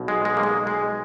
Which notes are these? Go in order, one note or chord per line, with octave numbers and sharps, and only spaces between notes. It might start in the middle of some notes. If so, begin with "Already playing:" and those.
Already playing: B1 B2
G#3
G#3
A#3
G#3
G#3